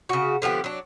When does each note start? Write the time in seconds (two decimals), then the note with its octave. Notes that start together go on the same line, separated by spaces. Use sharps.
0.09 C#3 F#4
0.42 D3 F3 B3 G4
0.64 F#3 D4